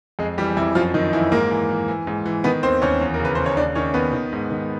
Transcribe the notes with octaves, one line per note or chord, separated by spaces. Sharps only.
F2 G#3 G#4
E3 G3 G4
F2 E3 E4
F#2 F3 F4
F#2 D#3 D#4
E3 F3 E4
G#2 A#3 A#4
E3
E3
E3
G#2
E3
D#3 B3 B4
D#2 C4 C5
D#2 C#4 C#5
E2
A#4
C#3 B4
C#3 C5
C#5
D#2 D4 D5
D#3 C#4 C#5
D#2 B3 B4
D#3
G#2
D#3